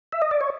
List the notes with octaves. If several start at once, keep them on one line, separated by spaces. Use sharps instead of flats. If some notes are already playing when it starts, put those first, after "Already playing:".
E5
D#5
D5
C#5